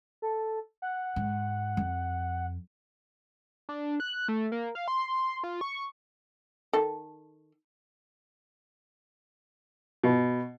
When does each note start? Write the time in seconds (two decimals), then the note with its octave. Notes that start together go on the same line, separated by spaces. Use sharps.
0.22 A4
0.82 F#5
1.16 G#2
1.77 F2
3.69 D4
4.00 F#6
4.28 A3
4.52 A#3
4.75 F5
4.88 C6
5.44 F4
5.61 C#6
6.73 D#3 A4
10.03 B2